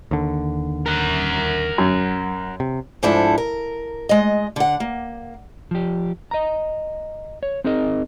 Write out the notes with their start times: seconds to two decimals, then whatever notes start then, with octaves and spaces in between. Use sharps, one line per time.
0.11 D#2 D3
0.86 A#4 F#5
1.78 F#2
2.60 C3
3.03 G#2 F3 D4 E4 A4
3.38 A#4
4.09 G#3 D#5
4.56 D3 F#5
4.80 A#3
5.71 F3 G4
6.31 D#5 A#5
7.43 C#5
7.64 C4 D#4 G#4 A#4 D#5